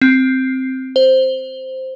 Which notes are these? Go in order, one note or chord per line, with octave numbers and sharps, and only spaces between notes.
C4
C5